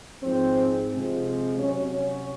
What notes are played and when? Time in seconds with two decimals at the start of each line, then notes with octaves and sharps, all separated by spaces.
0.23 G#2 F3 G#3 C4
0.91 C3 F3 G#3
1.59 C3 F#3 C#4
1.93 C#4